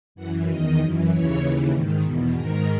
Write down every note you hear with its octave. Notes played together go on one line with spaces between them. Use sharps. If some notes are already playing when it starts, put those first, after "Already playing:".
F#2 E3 F#5
E2 D#3 D#5
F#2 E3
D#2 C#3 E3 C#5
D#2 C#3 E3
G#2 D#3
E2 B2
G#2 D#3 A#4